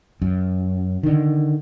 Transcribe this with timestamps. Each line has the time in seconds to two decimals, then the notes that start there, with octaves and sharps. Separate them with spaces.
0.22 F#2
1.03 D3 D#3